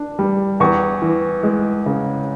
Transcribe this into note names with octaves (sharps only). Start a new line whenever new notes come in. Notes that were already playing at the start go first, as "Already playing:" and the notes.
Already playing: D4
G3
E2 C#6
E3
G#3
C#3